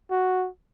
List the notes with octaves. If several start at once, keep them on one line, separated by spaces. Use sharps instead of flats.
F#4